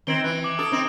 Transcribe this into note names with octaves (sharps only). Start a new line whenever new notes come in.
D#3 C4 G#6 D7 G7
E3 F#6 D7
D6 F#7
A4 D#6
C4 D#4